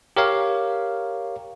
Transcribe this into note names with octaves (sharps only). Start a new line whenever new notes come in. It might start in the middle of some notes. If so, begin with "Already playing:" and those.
G4 A#4 C#5 F5